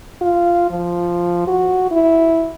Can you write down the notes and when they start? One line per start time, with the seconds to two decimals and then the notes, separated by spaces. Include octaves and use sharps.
0.22 F4
0.71 F3
1.48 F#4
1.91 E4